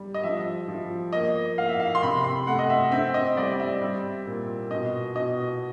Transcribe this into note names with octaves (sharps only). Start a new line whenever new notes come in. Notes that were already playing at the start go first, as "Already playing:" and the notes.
Already playing: G3
D#5
F3 E5
F3
A#3 D#5
A#3 F5
E5
F5
C6
C3 B5
C6
A3 F#5
D#5
E5
C4 E5
D#5
G3 D5
E5
G3
A#2
B2 D#5
B2 D#5